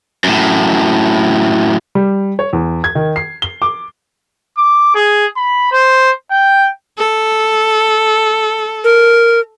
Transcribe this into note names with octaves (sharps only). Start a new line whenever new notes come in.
F#2 A2
G3
C#5
E2
G#6
D#3
C7
G7
D6
D6
G#4
B5
C5
G5
A4
A#4